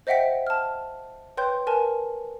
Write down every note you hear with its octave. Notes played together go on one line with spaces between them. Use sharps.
C5 D#5 E5 F#5 G5 B6
A5 F6
B4 C#5 G5 C6 G6
A#4 B4 G#5 A5